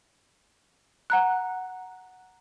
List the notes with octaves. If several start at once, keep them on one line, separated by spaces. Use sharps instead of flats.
F#5 A#5 F#6